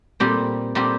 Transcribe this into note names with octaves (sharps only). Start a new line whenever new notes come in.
A#2 G3 C4 G4
A#2 G3 C4 G4